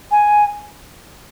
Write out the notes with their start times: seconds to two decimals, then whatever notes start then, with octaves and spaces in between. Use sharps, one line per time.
0.11 G#5